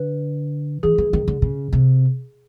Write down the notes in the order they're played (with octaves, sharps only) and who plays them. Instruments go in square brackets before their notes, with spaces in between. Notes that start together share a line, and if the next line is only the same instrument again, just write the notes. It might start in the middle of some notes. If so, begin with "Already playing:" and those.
Already playing: [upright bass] D3 [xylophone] B4
[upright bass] E3 [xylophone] G#4
[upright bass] E3
D#3
D3
C#3
C3